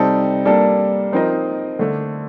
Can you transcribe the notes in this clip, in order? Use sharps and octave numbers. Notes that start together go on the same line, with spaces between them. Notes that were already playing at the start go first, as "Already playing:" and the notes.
Already playing: C3 G3 C4 D#4 A4
G3 A#3 D4 A4
F3 C4 D#4 A#4 D#5
D3 A3 D4